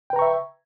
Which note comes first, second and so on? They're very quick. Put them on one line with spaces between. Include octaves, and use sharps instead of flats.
G5 B4 A#5 C#6 E5